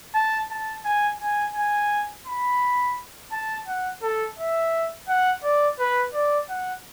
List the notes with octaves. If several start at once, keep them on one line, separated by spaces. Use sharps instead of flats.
A5
A5
G#5
G#5
G#5
B5
A5
F#5
A4
E5
F#5
D5
B4
D5
F#5